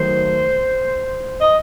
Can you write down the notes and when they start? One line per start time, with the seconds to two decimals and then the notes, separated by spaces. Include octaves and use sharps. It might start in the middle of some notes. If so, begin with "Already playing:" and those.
Already playing: D#3 F#3 A3 C5
1.41 D#5